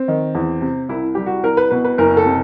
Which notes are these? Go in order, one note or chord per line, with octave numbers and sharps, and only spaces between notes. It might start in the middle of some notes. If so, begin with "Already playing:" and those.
Already playing: C4
D#3
E2
C3
C2 E4
G3 G4
F#4
C2 A#4
B4
B2 B4
B4
F#1 A#4
A4
C3